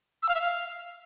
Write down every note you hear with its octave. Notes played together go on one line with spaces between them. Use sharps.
E6
F5
E5
F5